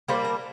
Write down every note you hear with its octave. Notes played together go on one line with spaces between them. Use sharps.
G3 A#3 D4 C5
A#4